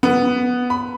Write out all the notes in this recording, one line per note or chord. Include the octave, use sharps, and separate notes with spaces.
B3
B5